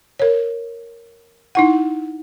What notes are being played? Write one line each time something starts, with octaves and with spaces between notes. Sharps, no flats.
A#4 C#5
D#4 E4 F#5